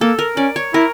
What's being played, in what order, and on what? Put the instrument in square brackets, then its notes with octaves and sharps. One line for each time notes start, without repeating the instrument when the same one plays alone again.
[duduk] A#3 [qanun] A4
[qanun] A#4
[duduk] C#4 [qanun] D5
[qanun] C#5
[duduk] E4 [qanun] A#4